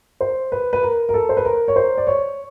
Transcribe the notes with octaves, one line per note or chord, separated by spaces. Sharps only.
C5
B4
B4
A#4
A#4
A4
C5
B4
A#4
C#5
C5
D5
C#5